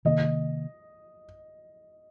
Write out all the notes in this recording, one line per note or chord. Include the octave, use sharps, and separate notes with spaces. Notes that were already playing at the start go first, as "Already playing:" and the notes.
C3 D#3 A#3 D#5